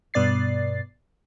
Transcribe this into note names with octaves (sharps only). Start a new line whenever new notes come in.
G2 B2 B3 D5 A6 C7